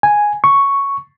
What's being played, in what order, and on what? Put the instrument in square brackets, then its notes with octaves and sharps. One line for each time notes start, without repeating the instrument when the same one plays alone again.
[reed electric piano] G#5
C#6